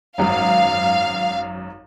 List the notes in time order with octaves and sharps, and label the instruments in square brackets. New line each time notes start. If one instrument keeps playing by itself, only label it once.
[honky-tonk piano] G#1 F#2 [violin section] F5